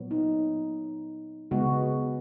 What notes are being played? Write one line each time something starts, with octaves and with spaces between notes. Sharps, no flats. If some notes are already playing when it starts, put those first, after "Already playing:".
Already playing: A#2 F#3 B3
D#4
C#3 G#3 B3 F#4